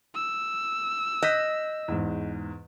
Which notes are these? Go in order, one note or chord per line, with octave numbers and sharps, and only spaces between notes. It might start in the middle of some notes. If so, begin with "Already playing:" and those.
E6
D#5 F#6 G6 B6
E2 G#2